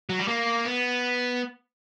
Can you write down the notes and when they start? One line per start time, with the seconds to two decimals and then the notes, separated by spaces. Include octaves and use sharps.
0.09 F#3
0.19 G3
0.28 A#3
0.65 B3